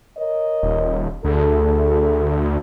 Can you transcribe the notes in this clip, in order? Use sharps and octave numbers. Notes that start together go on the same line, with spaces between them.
A#4 C#5 D#5
D#1
D2 A3 G#4 A4